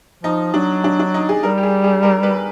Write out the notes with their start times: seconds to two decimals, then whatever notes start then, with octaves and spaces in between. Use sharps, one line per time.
0.23 F3 D#4
0.54 F#3 D4
0.84 D4
0.99 D4
1.14 D#4
1.29 G#4
1.43 G3 A#4
1.57 G4
1.63 G#4
1.84 G#4
2.03 A#4
2.23 B4